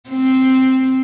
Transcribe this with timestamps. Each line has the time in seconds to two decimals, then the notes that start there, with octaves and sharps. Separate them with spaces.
0.10 C4